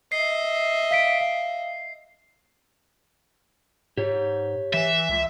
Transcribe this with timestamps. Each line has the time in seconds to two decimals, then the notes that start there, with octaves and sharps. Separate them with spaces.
0.12 D#5 E5 C7
0.91 F5 B6 D7
1.20 F5
3.97 G#2 G4 C#5
4.74 E3 E5
5.10 C#2